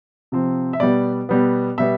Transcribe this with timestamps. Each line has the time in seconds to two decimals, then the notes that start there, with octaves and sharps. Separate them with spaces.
0.32 C3 F3 C4
0.73 E5
0.80 B2 G3 B3 D5
1.29 B2 G3 B3
1.78 B2 G3 B3 E5